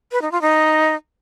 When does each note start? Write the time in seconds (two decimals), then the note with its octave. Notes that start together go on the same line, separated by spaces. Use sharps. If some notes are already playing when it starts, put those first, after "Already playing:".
0.12 B4
0.22 D#4
0.32 F4
0.42 D#4